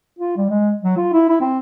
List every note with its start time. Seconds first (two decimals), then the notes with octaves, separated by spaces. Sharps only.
0.19 F4
0.37 G3
0.50 G#3
0.83 F#3
0.97 F4
1.13 E4
1.29 E4
1.41 C4